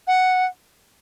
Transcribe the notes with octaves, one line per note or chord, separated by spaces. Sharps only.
F#5